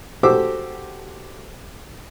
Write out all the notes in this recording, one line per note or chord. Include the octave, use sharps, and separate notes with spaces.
F#4 G4 A4 C5 D6 E6